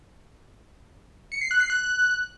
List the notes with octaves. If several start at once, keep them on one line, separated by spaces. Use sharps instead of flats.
C#7
C7
F#6
C7
F#6